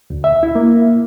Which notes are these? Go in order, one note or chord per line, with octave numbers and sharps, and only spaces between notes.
D2
E5
E4
A#3